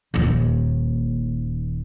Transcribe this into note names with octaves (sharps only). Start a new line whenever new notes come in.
D#1 D#2